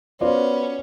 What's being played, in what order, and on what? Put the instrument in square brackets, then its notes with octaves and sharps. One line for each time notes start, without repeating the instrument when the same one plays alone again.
[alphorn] B3 [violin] C#4 [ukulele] F4 F#4 C5 [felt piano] D5